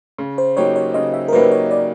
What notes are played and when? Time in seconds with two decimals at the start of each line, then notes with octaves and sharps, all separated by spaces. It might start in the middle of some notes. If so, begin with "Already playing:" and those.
0.18 C#3
0.38 C5
0.57 F#3 A#3 D#4 G4 C#5
0.76 C#5
0.94 C#3 D#5
1.14 E5
1.28 A#4
1.33 F#3 A#3 D#4 G4 B4
1.51 C#5
1.71 D5